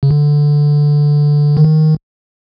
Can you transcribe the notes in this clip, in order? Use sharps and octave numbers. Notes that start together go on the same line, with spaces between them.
C#3
D3
D#3